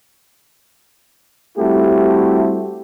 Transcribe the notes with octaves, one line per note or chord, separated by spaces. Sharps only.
G3 A3 C4 E4 F#4 G4